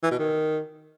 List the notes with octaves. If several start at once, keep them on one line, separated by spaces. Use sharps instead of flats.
E3
B2
D#3